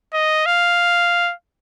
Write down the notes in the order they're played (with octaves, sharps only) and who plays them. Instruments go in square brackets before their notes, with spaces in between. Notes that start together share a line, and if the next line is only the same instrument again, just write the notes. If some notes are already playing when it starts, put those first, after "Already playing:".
[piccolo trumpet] D#5
F5